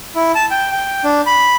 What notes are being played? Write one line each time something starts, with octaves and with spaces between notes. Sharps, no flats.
E4
A5
G5
G5
D4
B5